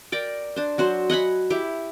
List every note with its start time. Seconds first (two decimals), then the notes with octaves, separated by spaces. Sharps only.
0.12 A#4 D5 G5
0.56 D4 C5
0.78 F#3 F#4 C5
1.10 D#5 F#5 G#5 B5
1.50 E4 G4